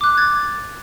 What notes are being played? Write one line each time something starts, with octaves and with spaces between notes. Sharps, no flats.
D6 F#6
G#6 A6